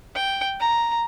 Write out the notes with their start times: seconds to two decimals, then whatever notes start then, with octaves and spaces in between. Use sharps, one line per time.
0.15 G5
0.60 A#5